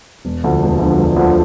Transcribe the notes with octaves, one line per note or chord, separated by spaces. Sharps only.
E1
D2 D3 F3
E1
D2 D3 F3
E1
D2 D3 F3